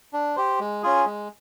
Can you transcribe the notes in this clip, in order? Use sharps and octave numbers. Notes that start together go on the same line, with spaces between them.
D4
G4 C5
G#3
C#4 F4 G#4
G#3